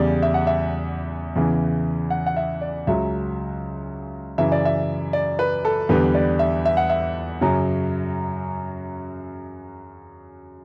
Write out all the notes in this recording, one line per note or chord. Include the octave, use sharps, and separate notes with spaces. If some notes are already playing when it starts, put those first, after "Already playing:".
Already playing: E2 C#3 G3 D5
E5
F#5
E5
E2 C#3 E3
F#5
F#5
E5
D5
C#2 C#3 F#3 E5
F#2 C#3 E3 E5
D5
E5
D5
B4
A4
E2 D3 G3 B4
D5
E5
E5
F#5
E5
F#2 C#3 F#3